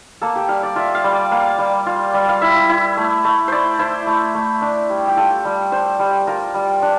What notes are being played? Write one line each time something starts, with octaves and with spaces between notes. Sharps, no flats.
A#3 A4
G4
G3 F5
D5
F4 E5
F5
G3
D5
A#3 F5
G3
F4
G3
F5
E4 E5
E4
A3
A3
E4 C5 D5
E4 C5
A3
A3
D4
G3
G4
F4 A4
G3
D4 C5
G3
F4 A#4
G3
D4